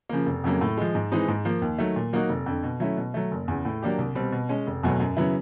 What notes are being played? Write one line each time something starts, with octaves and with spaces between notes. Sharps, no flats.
C#3 F3 A#3
F1
F2 C#3 F#3 A#3
A2
F3 G#3
G#2
E3 G#3 C4 D#4
G#2
F3 A#3
D#2
D#3 F#3 A3
A#2
F#3 A#3 D#4 F#4
F1
F2 D3
B2
F#3 A3 C#4 E4
B2
F#3 A3
F#1
E2 C#3
A2
F#3 A#3 D4 G4
C2
B2 G3 C4
B2
G#3 C#4
F1
E2 B2 F#3 A3
F#2
C#3 F#3 B3 E4